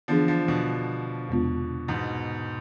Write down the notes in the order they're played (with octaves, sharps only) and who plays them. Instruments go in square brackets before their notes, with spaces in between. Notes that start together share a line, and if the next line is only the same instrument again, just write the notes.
[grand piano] D3 F3 [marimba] E3 B3 D4 G#4
[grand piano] D3 F3
B2 D3
[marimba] E2 C3 G#3 B3 F4
[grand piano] G#2 B2